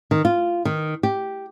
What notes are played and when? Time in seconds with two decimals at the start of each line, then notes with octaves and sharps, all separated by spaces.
0.11 D#3
0.25 F4
0.65 D#3
1.03 G4